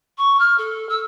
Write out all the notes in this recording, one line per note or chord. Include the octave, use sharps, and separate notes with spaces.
C#6
F6
A4
E6